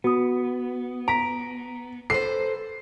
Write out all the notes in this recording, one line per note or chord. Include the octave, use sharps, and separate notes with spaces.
B3 F#4 D#6
A#5 B6 D7
A4 B4 C5 C7